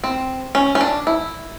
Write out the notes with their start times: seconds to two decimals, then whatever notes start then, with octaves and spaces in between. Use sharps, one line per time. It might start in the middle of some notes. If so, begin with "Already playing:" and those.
0.04 C4
0.55 C#4
0.75 C#4
0.81 D4
1.07 E4